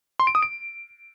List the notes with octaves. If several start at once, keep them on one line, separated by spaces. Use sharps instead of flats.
C6
D7
D#6
D7